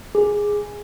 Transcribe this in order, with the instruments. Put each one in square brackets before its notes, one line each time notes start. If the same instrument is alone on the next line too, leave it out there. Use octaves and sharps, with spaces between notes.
[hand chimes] G#4